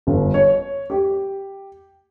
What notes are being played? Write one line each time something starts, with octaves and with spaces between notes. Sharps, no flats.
G1
C#5
G4